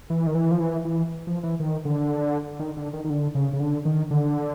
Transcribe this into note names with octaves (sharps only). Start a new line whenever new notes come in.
E3
D#3
E3
F3
E3
E3
F3
E3
D#3
D3
D#3
D3
D#3
D#3
D3
C#3
C#3
D3
D#3
D3